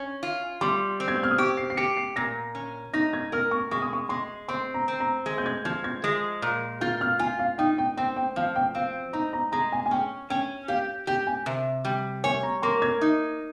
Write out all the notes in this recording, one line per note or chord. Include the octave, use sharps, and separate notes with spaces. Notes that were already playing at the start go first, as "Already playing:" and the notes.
Already playing: C#4
F4
G3 C6
C4
G#6
G6
F6
D#6
G4 C#6
C7
C7
G4 C#7
C7
A#2 A#6
C#4
D#4 A#6
G#6
A#4 F6
C#6
G#3 C#6
D#6
C#6
G#3 C6
C4 C6
A#5
C4
A#5
G#3
G6
G#6
F3 G#6
G#6
G#3
A#2
F4 G6
F6
F4 G#5
F5
D#4 G5
G5
C4 G5
G5
F3 F5
G5
C4 F5
D#4 A#5
A#5
G#3 A#5
G#5
G#5
C#4 G5
C#4 G5
G4 F5
G4 G5
G#5
C3
G3 G5
C#5 G#5
A#5
A#3 C6
G#6
D#4